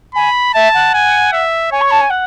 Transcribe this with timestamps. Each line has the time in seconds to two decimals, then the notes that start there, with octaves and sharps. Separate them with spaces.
0.15 G#5 B5
0.54 E5 A5
0.74 F#5
0.94 G#5
1.32 E5
1.71 C#5 G#5
1.81 C#6
1.91 A5
2.01 G#5
2.10 F#5